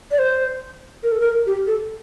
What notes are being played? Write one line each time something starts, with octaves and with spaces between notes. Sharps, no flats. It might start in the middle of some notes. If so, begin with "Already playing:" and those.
D5
C5
A#4
A4
A#4
G4
A4